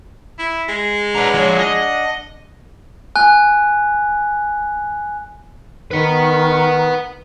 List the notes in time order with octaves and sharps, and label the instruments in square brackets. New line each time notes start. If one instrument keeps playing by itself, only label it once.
[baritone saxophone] E4
G#3
[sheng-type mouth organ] D4 F#5 [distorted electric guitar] B4 A#5
[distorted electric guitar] F3 C#5
D#5
[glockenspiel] G#5 F#6
[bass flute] D#3 [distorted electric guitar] B4 F#5